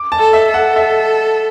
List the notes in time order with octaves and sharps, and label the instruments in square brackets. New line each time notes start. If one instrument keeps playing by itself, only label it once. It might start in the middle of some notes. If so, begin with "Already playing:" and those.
Already playing: [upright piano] D6
A5
[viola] A4
[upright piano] E5
[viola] A4
[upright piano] F#5
E5